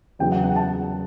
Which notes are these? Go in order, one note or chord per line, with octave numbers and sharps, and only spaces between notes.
E2 C#3 F#3 B3 G5
F#5
F#5
A5